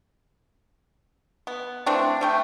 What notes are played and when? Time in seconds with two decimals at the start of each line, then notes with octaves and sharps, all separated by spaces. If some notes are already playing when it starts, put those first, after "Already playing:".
1.47 B3
1.86 E3 A3 C4 D4
2.21 G3 A3 G5